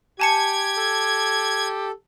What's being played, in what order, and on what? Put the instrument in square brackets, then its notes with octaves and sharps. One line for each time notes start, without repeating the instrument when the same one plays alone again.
[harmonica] G4 [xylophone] G#5 A5 C#7 [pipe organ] G#6
[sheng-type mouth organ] A4